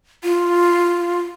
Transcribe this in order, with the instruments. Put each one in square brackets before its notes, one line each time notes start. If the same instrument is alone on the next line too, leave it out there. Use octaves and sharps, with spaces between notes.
[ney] F4